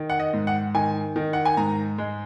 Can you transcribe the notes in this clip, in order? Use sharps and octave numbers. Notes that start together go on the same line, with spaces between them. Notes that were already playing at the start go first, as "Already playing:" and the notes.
Already playing: D#3
F#5
D#5
G#2
F#5
D#3 G#5
D#3
F#5
G#5
G#2 A#5
G#3